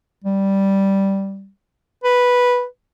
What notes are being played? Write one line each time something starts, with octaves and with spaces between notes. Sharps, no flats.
G3
B4